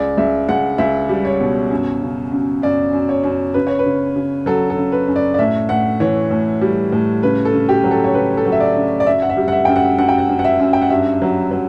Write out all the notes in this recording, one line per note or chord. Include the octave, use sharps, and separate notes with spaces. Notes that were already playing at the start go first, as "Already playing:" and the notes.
Already playing: C#2 D5
C#2 E5
C#2 F#5
C#2 E5
G3
C#5
B2
F#2
C#3
F#2
F#2 D5
F#2
C#5
F#2
C#3 B4
C#5
B4
C#3
C#3
F#3 A4
A4
C#3
B4
F#2
D5
D5
A2 E5
A2 F#5
E3 C#5
A2
G3
A2
C#3 B4
A4
C#3
G4
F#3
A4
C#5
C#3 B4
A4
F#3
E5
D5
C#3
D5
F#2 E5
F#5
E5
G3
F#5
E5
F#2 G5
F#5
F#2 F#5
G5
F#5
F#2
F#5
E5
F#2
G5
F#5
G2 E5
F#3
F#3